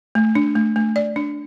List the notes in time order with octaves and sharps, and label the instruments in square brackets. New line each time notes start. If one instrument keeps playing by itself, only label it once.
[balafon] A3
D4
A3
A3
D5
D4